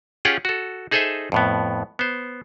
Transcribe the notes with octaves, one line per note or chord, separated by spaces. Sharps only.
C#4 F4 G4 G#4 F#5 G5
F#4 A4
D#4 G#4 A4 C5 D#5 E5
F2 A2 B3
B3 C5